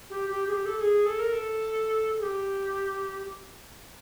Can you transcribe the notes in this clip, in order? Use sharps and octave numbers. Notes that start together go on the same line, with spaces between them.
G4
G4
G#4
G4
A4
A4
G#4
A4
A#4
A4
G#4
G4